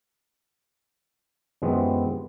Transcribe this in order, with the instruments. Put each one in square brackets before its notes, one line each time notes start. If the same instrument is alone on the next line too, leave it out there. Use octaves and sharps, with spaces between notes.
[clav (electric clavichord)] F#2 C3 E3 G#3 B3 C4